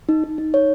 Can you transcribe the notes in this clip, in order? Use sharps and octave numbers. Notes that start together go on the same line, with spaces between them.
D#4
D#4
D#4
C#5